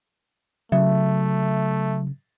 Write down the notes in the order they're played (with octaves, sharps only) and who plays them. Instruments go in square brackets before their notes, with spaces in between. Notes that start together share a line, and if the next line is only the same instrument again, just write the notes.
[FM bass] C#3 [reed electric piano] F#3 [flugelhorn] A3 [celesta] E5